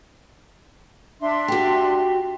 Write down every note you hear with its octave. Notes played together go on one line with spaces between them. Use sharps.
D4 E5 C6
F#4 G4